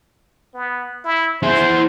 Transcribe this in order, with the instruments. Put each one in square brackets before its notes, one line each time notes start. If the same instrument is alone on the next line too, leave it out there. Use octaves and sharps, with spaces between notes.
[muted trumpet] B3
E4
[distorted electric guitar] E4 G#4 [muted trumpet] C5